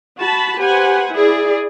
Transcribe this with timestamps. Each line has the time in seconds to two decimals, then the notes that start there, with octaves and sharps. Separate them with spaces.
0.20 F#4 A5 B5
0.59 G4 B4 C5 F#5 G#5
1.13 E4 G#4 D5